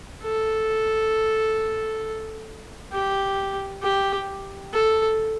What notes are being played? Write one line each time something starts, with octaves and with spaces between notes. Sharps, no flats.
A4
G4
G4
A4